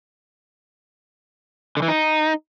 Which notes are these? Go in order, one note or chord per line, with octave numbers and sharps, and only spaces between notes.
D3
E3
D#4